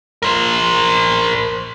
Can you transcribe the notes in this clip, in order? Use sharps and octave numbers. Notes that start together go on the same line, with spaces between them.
A#4 C5